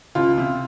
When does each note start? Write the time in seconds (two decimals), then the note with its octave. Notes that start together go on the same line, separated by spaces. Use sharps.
0.15 C#2 F4
0.38 C3